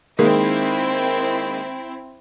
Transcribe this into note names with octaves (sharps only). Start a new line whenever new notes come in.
D#3 G#3 A#3 C4 E4